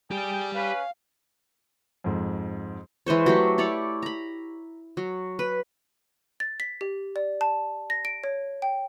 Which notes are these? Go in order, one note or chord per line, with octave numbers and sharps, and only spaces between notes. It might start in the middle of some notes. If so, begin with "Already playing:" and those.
G4 G#4 D5 G5
C#4 B4 F5
F2 G#2
E3 G#3 C5 C#5
F#3 A3 G4
E4 A4 C#5 D5
A#5 B5
F#3
B4
A6
B6
G4
D5
A5
A#6
D7
C#5
G5